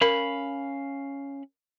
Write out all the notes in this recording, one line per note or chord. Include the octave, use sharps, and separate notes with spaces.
C#4 A#4 F5 B5